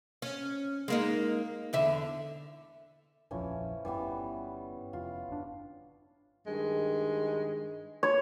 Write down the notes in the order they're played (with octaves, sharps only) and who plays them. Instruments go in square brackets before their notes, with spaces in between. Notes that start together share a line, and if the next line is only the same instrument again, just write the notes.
[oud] C#4
G#3 A#3 D#4
E2 D3 E5
[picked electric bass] D#1 A#1 F2 [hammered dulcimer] E3 F3 C#4
[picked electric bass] G1 G2 [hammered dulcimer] E3 G3 B3
[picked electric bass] F1 [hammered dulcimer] F4
[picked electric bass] G1 D4
[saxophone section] G2 D#3 G#3
[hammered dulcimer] C#5